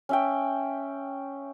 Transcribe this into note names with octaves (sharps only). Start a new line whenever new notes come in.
C#4 E5 G5